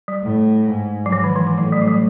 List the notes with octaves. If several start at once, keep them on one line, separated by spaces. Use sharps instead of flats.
G3
A2
G#2
F#3
G#2 F3
D#3
E3
F3
A2 F#3
G3
F#3
G3